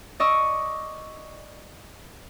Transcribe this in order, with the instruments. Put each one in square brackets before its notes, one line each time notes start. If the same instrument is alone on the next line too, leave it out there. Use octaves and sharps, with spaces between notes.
[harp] D5 D#5 C#6 E6